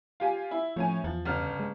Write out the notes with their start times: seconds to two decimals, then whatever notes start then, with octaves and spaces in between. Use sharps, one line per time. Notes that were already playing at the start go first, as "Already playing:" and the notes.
0.20 F4 G4 G#5
0.51 E4
0.76 A2 F3 C#4 G#5
1.04 E2 F3
1.25 G1 C#3 F6
1.60 G#3